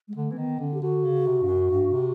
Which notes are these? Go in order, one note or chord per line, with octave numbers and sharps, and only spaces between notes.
G#3
D3 A3
E3 C4
D#3 B3
D3 C#4
G4
D3 F#4
C#3
C3
G2
F#2
G2
C3